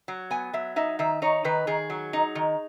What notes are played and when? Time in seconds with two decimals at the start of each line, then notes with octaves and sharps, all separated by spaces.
0.08 F#3
0.30 B3 G#5
0.53 F#3 E5
0.76 D#4 E5
0.99 D#3 E5
1.22 D#4 C#5
1.45 D#3 B4
1.67 D#3 G#4
1.90 F#3
2.13 D#4
2.35 D#3